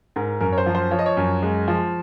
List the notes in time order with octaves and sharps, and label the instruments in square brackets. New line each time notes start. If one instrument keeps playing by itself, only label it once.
[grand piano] G#2 A#4
F#2 A#4
C#5
C5
F3
C5
F3 C#5
D#5
C#5
F#2
G#3
F3